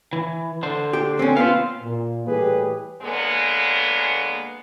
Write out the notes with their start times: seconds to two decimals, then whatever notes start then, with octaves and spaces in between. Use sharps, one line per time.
0.13 E3
0.63 D3 C5
0.93 G4
1.19 C4 C#4
1.37 B3 C4 F4 C5 F5
1.82 A#2
2.27 A2 E3 G3 G4 G#4 B4
3.02 D3 F#3 G#3 A#3 B3